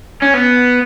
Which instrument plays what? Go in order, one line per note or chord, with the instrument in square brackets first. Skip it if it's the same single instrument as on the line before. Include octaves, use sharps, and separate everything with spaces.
[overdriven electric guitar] C#4
B3